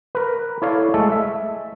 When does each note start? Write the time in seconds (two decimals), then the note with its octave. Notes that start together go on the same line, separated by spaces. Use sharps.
0.15 A#4 B4
0.62 E4 A4 C#5 D5 F5
0.94 G#3 A3 A4
1.12 E5